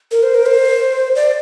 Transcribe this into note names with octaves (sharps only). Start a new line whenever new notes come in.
A#4
C5
A#4
C5
D5